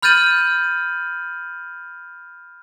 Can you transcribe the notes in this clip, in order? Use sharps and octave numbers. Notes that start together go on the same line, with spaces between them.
B5 F6 G6 A6 D#7 F#7